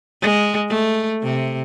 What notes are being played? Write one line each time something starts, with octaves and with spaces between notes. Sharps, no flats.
G#3
A3
C3